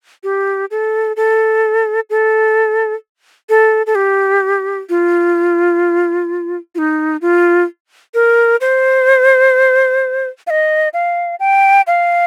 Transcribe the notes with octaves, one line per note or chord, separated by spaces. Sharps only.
G4
A4
A4
A4
A4
A4
G4
F4
F4
D#4
F4
A#4
C5
F5
D#5
F5
G5
F5